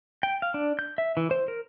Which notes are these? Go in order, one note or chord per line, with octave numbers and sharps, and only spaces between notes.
G5
F5
D4
G6
E5
E3
C5
A#4